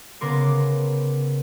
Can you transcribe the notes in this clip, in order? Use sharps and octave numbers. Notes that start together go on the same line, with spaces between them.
C#3 B3 A#4 C6 D6